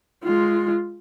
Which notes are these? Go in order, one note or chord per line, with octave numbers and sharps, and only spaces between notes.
G#3 F4